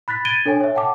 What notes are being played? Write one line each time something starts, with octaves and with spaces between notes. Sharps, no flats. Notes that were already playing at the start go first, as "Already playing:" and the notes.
B5 F#6 A6 B6
G#6 A6 D7 D#7 G7
D4 A4 C#5 G5 G#5
C#5 E5
F#5 G5 A5 D6